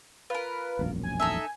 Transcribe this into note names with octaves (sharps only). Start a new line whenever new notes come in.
F4 A#4 B4
E1 A#1 F#2
G#5
D#4 A4 E5